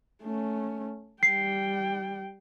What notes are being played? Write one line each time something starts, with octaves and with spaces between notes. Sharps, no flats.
A3 C#4
G3 G5 C7